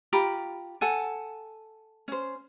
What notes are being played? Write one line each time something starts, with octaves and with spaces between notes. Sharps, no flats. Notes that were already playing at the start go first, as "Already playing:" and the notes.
F4 G4 A#5 B5
A4 F#5 G#5
C#4 C5